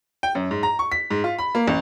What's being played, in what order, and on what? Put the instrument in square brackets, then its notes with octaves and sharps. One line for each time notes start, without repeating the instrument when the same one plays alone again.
[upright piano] G5
F#2
G#2
A#5
C#6
B6
G#2
F4
B5
A#3
A1